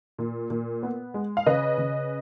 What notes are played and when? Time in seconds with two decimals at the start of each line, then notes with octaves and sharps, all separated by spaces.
0.18 A#2
0.50 A#2
0.83 B3
1.14 G#3
1.37 F5
1.46 C#3 B4 D#5
1.78 C#3